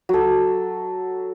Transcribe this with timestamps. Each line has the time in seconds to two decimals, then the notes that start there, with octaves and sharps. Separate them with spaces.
0.09 F#3 A4